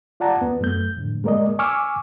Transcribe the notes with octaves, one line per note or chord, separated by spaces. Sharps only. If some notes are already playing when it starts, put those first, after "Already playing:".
F4 D5 F#5 A5 A#5
E2 B3
F#2 A3 G6
F2 A2 D3
G#3 A#3 A#4 D5 D#5
G#5 C#6 D6 E6 F6